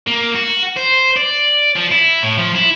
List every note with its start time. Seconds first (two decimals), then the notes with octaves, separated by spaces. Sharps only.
0.07 A#3
0.36 F#4
0.77 C5
1.16 D5
1.76 F3
1.91 E4
2.22 A2
2.38 F3
2.55 E4